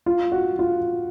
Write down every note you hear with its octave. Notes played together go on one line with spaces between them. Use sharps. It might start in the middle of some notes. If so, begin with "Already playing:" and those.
F4
F#4
F4